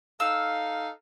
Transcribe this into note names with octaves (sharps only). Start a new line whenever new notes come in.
D#4 A4 F5 E6